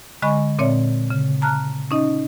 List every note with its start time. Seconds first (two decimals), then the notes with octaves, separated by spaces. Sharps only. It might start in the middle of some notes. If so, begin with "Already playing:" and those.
0.22 D3 G#3 D#5 G#5 B5 C#6
0.59 A#2 C4 C#5 D5 E5
1.10 C#3
1.42 A5 A#5 F6 F#6
1.91 C#4 D#4 D#5